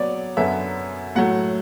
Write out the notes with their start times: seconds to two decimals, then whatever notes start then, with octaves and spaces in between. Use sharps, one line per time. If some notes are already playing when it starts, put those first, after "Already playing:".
Already playing: F#3 B3 C#5 D5
0.37 F#2 D3 F#3 B3 E5
1.15 A2 F#3 A3 F#5